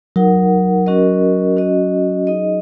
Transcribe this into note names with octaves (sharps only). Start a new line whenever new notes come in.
F#3 D#4 A#4 F#5
C#4 F#4 A#4 D#5
C#4 F#4 D#5
D#4 G#4 D#5